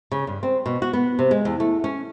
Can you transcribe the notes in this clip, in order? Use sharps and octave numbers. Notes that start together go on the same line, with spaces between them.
C#3
G2
C4
B2
F#4
B3
C3
G#3
E2
A3
C#4